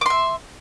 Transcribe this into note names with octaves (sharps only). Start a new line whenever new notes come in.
E5 C6 D6